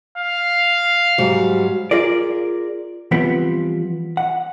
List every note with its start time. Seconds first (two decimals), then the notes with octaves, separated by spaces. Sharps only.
0.17 F5
1.18 G#2 F#3 G3
1.91 F4 G#4 A#4 D5
3.11 E3 F3 G3 B3 C4 F4
4.17 F#5